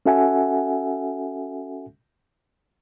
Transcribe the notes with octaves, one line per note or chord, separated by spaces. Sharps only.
C#4 F#4 A4 E5 F#5 G#5